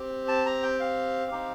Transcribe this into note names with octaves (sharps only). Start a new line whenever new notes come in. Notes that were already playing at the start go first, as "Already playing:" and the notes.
Already playing: C4 G4
A5
A#5
G5
F5
C4 D#4 G4